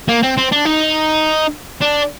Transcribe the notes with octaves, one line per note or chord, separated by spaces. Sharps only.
A#3
C4
C4
D4
D#4
D4